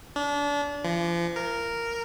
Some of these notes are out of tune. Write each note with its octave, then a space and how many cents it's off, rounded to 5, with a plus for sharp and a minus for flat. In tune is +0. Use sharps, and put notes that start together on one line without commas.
D4 -30
F3 -40
A#4 -5